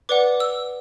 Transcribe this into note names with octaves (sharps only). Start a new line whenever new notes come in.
B4 D5 F#5 D6
E6